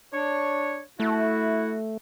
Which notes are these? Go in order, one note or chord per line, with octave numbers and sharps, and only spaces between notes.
D4 C#5
A3 E4 F#4